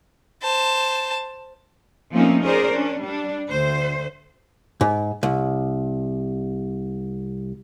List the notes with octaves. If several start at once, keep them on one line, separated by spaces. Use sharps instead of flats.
C5 A5
F3 A3 A#3 C4 C#4 D#4
C#4 G#4 A#4 C5 D5
C#4 D4
G3 D4
D2 C5
G#2
C2